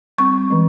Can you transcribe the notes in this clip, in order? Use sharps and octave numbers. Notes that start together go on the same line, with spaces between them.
G3 C4 C#6
E3 G#3 C#4